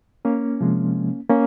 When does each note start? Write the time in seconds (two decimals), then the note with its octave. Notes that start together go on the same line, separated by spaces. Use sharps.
0.25 A#3 C#4
0.61 C3 F3 G#3
1.30 A#3 C#4